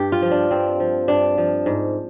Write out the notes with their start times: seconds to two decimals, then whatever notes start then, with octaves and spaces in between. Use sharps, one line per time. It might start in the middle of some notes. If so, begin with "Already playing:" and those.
Already playing: G2 G4
0.12 F4
0.22 F3
0.31 D4
0.51 G2 C4
0.80 F3
1.08 G2 D4
1.38 F3
1.66 G#2